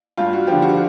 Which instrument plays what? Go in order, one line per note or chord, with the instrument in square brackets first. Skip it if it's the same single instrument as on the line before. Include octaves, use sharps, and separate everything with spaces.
[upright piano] G2 F4
F#4
D3 F3 G4
F#4